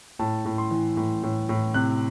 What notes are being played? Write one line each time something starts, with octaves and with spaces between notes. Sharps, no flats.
A2 A5
A2
C6
E3
A2
A2
A2
C3 F#6